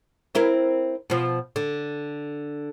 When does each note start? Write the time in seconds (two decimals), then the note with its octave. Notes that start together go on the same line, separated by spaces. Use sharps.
0.35 C4 E4 A#4
1.10 B2 F3
1.56 D3